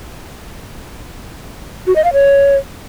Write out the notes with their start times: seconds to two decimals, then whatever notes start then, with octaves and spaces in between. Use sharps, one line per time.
1.87 F#4
1.96 D#5
2.04 F5
2.13 C#5